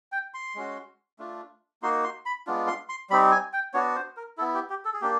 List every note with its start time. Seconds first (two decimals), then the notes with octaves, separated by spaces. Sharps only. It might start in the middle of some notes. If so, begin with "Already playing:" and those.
0.12 G5
0.34 C6
0.55 G#3 C#4 F#4
1.19 A3 D4 F4
1.82 A#3 D#4 F#4 C6
2.04 C6
2.26 B5
2.47 G#3 B3 D4 F4
2.68 C6
2.89 C6
3.10 G3 C4 D#4 B5
3.31 G#5
3.53 G5
3.74 B3 D4 F#4 C#5
3.95 C5
4.17 A#4
4.38 E4 A4
4.41 B3
4.54 G4
4.70 G4
4.85 A4
4.93 G#4
5.01 A#3 D4 G4